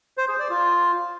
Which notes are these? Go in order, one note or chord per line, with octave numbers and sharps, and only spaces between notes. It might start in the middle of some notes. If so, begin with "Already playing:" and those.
C5
G#4
D5
F4